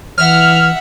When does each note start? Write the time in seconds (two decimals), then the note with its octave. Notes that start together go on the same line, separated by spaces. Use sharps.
0.18 E3 E5 F#5 F6